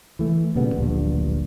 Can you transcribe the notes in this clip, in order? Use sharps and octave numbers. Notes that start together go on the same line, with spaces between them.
E3 A3
A#2 C#3 G3 B3
D1 A#1 G2